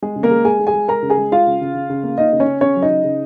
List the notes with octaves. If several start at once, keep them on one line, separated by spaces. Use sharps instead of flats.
G#3 G#4
C#3
A#3 A#4
G#3
G#3 G#4 G#5
G#3
G#4 G#5
G#3
G#3 A#4 A#5
C#3
G#4 G#5
G#3
G#3 F4 F5
C#3
C#3
C#3
C#3
A#3
A#3 D#4 D#5
C#3
C#4 C#5
C#3
C#3 C#4 C#5
F#3
D#4 D#5
C#3
C#3